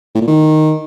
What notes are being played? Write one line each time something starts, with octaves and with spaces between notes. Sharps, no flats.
A2
A#2
D#3